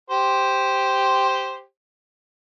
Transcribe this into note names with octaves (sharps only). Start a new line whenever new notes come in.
G4 C5